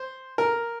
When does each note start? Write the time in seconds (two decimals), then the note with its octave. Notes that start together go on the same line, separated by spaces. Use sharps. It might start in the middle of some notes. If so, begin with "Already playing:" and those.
Already playing: C5
0.38 A#4